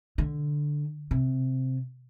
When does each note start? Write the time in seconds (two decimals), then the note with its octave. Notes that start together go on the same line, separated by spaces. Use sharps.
0.18 D3
1.11 C3